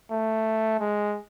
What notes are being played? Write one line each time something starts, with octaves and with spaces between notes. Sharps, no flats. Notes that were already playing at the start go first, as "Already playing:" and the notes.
A3
G#3